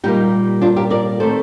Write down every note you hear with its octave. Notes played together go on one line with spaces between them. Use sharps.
A#2 G3 A#3 D#4 G4
D4 F4
G4 A#4
A#4 D5
D#3 A3 C4 A4 C5